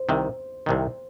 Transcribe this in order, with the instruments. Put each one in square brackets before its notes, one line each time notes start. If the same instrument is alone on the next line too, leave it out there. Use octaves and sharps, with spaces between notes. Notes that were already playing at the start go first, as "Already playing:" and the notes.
Already playing: [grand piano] C5
[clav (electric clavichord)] C2 C3 D#3
C2 C3 D#3